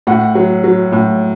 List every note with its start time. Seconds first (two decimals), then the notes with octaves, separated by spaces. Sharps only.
0.07 A2 F#5
0.35 F#3
0.64 F#3
0.92 A2